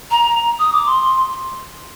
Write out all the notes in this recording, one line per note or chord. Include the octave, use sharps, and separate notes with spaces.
A#5
D#6
D6
C6